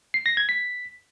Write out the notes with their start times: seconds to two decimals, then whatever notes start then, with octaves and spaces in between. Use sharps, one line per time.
0.14 C7
0.26 A#6
0.37 G#6
0.49 B6